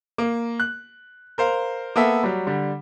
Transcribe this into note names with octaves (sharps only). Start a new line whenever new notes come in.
A#3
F#6
A#4 C5 F5
A#3 B3 A4 E5
F#3 G3
D3 G3